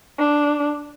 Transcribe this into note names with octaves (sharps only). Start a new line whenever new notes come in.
D4